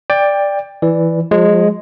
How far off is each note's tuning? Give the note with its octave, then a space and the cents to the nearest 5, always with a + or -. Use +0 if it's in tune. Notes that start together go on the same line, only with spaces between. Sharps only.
D5 +0 G5 +20
E3 +0 D5 +0
F3 +35 G#3 +0